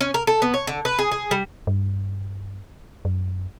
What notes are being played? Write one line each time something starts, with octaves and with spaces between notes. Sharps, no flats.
C#4
A#4
A4
B3
C#5
D3
B4
G#4
G#4
G3
G2
F#2